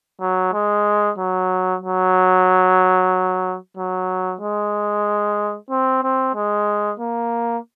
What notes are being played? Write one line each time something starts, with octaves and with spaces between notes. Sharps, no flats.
F#3
G#3
F#3
F#3
F#3
G#3
C4
C4
G#3
A#3